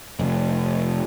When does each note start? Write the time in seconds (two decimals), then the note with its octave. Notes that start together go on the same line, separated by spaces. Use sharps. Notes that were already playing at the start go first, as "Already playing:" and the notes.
0.19 F1